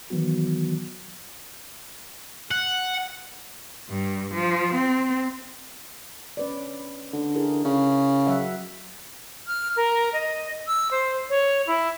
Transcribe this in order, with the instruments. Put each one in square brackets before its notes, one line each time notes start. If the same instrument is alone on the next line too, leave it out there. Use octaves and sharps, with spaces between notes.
[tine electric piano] D#3 E3 F#3 B3 F#4
[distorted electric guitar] F#5
[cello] G2
F3
C4
[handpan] C#4 B4 D5
[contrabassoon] D3
[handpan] E4 G#4 A#4
[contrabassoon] C#3
[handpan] F#3 E5 F#5
[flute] F6
A#4
D#5
E6
C5
C#5
E4